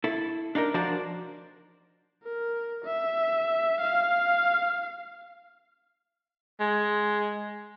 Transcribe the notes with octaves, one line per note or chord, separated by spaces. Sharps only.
E4 A4
D4 D#4 F#4 A#4
F3 D4 F#4 A#4 C5 D5
A#4
E5
F5
G#3